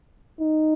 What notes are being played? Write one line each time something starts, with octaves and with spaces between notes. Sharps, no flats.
D#4